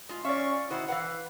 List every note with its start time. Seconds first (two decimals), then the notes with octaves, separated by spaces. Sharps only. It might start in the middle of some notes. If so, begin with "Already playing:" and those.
0.09 G#3 F4
0.25 C#4 D5 E5 F5 C#6
0.70 B2 D#3 E4 C5 F#5
0.88 E3 B4 F5 F#5